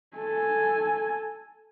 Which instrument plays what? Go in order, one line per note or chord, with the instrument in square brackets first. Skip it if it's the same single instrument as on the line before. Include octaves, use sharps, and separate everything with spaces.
[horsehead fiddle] A4 G#5